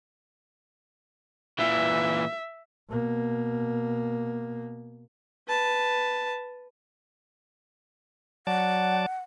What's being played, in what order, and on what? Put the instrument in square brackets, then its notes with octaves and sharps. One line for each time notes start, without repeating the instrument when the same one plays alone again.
[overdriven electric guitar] A#2 E3 [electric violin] E5
[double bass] B2 A#3
[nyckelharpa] B4 A5
[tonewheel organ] F#3 D5 A5 [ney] F#5